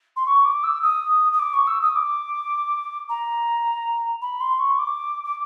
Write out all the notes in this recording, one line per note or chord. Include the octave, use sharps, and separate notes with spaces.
C6
C#6
D6
E6
D#6
D#6
D6
C#6
E6
D#6
D6
A#5
B5
C6
C#6
D6
D6